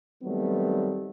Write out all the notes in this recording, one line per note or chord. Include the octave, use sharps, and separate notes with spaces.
D#3 F#3 G3 A3 B3 C4